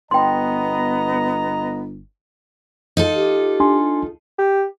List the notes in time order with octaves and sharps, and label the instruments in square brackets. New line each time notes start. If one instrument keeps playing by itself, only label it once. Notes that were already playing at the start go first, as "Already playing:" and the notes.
[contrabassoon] G1 [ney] B3 [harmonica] D#5 A#5 [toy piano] G5 C6
[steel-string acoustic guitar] D#4 F4 A4
[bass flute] G4
[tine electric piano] D4 G#5 C6
[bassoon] G4